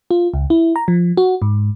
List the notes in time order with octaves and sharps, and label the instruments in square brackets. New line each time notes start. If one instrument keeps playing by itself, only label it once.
[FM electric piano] F4
C#2
E4
A#5
F3
F#4
G#2